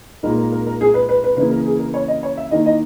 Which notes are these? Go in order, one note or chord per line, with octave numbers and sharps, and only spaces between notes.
A#2 G#3 D#4 A#4
A#4
A#4
A#4
G#4
B4
B4
B4
C#3 E3 A#3 E4 B4
A#4
G#4
A#4
C#5
D#5
C#5
E5
D#3 A#3 E4 D#5
D#5